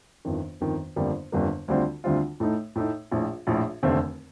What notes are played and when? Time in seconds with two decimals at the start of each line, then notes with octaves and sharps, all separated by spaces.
0.25 G1 F2 D#3
0.61 G1 F2 D#3
0.96 G1 F2 D3 G3 A#3
1.32 G1 F2 D3 G3 A#3
1.68 D2 D3 G3 C4 F4
2.04 D2 D3 G3 C4 F4
2.40 A2 A3 D#4
2.76 A2 A3 D#4
3.11 A#1 A2 F3
3.47 A#1 A2 F3
3.83 F1 D#2 D3 A3 C4